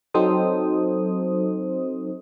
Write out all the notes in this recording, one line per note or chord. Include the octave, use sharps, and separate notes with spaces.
F#3 C4 D#4 A4 C5 D#6